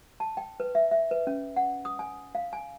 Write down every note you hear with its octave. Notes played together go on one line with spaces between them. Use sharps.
A5
G5
B4
E5
E5
B4
C#4
F#5
D#6
G#5
F5
G#5